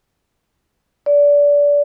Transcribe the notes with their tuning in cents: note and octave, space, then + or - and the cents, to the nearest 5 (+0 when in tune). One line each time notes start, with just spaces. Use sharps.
D5 -25